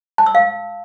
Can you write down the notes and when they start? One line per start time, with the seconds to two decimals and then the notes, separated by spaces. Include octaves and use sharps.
0.18 A5
0.26 E6
0.35 F5